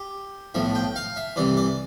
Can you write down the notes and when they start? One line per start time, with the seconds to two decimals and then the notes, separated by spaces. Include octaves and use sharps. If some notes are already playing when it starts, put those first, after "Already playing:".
Already playing: G4
0.54 B1 A2 F3 E5
0.75 G5
0.96 F5
1.16 E5
1.36 C2 C3 E3 D5
1.57 D5